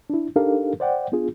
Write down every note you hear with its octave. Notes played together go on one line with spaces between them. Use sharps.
D4 E4
D4 D#4 G4 A4 A#4 F5
C5 D5 F#5 G5
B3 D4 F4 G#4